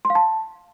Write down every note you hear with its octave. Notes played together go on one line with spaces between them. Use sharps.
C6
F5
A5